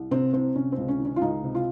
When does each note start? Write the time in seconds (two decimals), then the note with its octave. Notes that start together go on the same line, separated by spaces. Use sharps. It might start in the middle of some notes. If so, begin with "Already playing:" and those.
Already playing: C2
0.11 C3 C4
0.33 C2 C4
0.55 C3 C#4
0.72 C4
0.77 C#2
0.88 C#4
0.99 D#3
1.05 C#4
1.16 F4
1.21 C#2 D#4
1.43 C3
1.55 F4